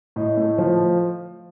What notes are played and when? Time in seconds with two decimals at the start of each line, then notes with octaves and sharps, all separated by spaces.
0.16 A2 D#5
0.37 A3
0.58 F3